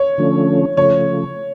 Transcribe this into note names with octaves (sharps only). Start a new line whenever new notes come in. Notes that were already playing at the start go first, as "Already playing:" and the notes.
Already playing: C#5
D3 F3 A3 C#4
C#3 F3 A3 C#5